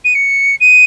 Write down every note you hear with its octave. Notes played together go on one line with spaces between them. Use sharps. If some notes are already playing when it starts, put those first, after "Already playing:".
D#7
C#7
D#7